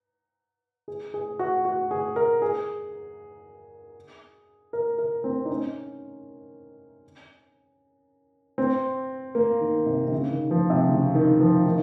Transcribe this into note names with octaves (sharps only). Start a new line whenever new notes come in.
G#4
G#4
F#4
F#4
G#4
A#4
G#4
A#4
A#4
C4
D#4
C#4
C4
A#3
D#3
C3
C3
C#3
D#3
F3
C3
C#3
D#3
F3
D#3